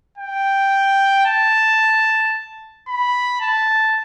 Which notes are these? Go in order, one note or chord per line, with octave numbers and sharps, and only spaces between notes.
G5
A5
B5
A5